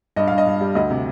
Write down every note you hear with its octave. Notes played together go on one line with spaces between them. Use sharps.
G2 D#5
G2 F5
D#5
G2
G3
D2 D#5
C3